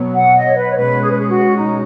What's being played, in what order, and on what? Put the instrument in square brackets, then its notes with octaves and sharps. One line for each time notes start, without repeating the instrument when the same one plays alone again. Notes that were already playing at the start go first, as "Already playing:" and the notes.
Already playing: [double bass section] B2 F#3 B3
[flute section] F#5
D#5
C#5
B4
C#5
[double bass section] B2 G#3 C#4 [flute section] B4
[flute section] G#4
B4
G#4
F#4
D#4